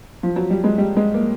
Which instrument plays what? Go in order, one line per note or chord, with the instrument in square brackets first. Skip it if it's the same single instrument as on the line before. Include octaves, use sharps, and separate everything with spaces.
[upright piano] F3
F#3
G3
G#3
G3
G#3
A#3